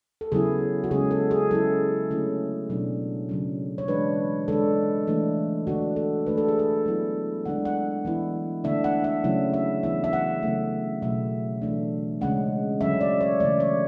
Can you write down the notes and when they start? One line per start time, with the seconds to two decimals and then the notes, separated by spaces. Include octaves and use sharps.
0.21 A4
0.32 C#3 F#3 B3 E4 G#4
0.84 F#4
0.91 C#3 G#3 C#4 G#4
1.11 A4
1.31 G#4
1.51 F#3 C#4 E4 A4
2.11 D3 A3 C#4 E4
2.70 B2 F#3 B3 D4
3.29 C#3 F#3 C#4
3.78 C#5
3.88 E3 G#3 D4 B4
4.48 D3 G#3 D4 A4
5.07 E3 A3 D4
5.67 D3 A3 D4 F#4
5.96 A4
6.26 D3 A3 D4 B4
6.38 A4
6.48 G#4
6.59 A4
6.86 F#3 B3 E4
7.45 D3 G#3 D4 F#5
7.65 F#5
8.05 E3 B3 E4
8.64 D3 A3 D4 E5
8.84 F#5
9.04 E5
9.24 C#3 F#3 A3 C#4 E4
9.54 E5
9.83 E3 B3 E4 E5
10.04 E5
10.13 F#5
10.43 C#3 F#3 A3
11.02 B2 F#3 A3 E5
11.62 E3 A3 D4
12.21 C#3 G#3 C#4 F#5
12.81 D3 F#3 C#4 E5
13.01 D5
13.21 C#5
13.40 C#3 E3 A3 D5
13.60 C#5